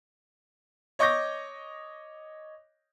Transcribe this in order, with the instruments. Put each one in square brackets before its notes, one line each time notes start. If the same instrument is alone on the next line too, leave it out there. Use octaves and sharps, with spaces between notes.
[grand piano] C#5 D#5 C#6 D6 G6 A#6